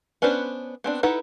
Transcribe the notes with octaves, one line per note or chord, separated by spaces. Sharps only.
B3 C#4 D4 B4 C5
B3 C4 D4
D#4 E4 A4 B4 F#5